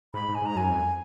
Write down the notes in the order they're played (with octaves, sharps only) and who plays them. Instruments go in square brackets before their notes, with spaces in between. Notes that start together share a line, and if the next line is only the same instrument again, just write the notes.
[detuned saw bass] G#2 [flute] B5
[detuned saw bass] G#2
[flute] G#5
[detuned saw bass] G#2 [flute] A#5
[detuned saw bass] F#2 [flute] G#5
[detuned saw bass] F2